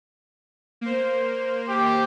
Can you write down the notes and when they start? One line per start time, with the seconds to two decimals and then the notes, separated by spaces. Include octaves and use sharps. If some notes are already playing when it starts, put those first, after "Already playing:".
0.81 A#3 C5
1.69 G4